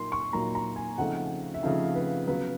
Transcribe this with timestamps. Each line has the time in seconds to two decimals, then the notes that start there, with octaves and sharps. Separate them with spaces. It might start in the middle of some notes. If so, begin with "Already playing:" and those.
Already playing: A#2 F#3 A#3 D#4 C6
0.12 C#6
0.33 A#2 F#3 A#3 D#4 A#5
0.55 A#5
0.76 G#5
0.98 C#3 F3 A3 C4 D#4 F#5
1.54 E5
1.63 C#3 F3 A3 C4 D#4 F5
1.95 B4
2.27 C#3 F#3 B3 B4